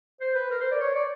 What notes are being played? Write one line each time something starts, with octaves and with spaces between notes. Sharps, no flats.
C5
B4
A#4
C5
D5
C#5
D5